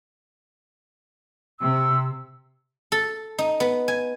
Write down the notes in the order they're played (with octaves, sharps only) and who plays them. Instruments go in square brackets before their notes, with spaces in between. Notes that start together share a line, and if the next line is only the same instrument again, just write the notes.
[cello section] C3 [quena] E6
[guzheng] A4
D#4
B3
G#5